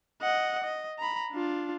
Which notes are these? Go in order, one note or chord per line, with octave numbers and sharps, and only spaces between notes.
D#5 F#5
D#5
A#5 B5
D4 F4